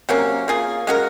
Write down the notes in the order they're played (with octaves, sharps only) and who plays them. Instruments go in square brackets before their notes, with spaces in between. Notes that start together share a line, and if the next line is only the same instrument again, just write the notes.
[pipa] C3 F#3 A#3 C#4
A#3 F4 G#4
G#3 C#4 F#4 A#4